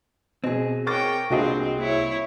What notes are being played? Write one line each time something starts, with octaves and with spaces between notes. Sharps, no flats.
B2 C4 G#4 D#5 G#5
A#4 C#5 G5 C#6 D6 A6 A#6
C2 A#3 C4 D4 F4 F#4 G#4 D#5
A#3 E4 C#5 E5